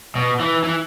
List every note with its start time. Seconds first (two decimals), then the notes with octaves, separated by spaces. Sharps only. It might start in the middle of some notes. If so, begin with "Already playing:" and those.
0.15 B2
0.40 E3
0.64 E3